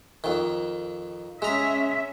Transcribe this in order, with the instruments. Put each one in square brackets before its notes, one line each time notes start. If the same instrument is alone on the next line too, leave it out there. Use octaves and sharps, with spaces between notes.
[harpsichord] F2 D#3
[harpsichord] G#3 A#5 [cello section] C#4 E5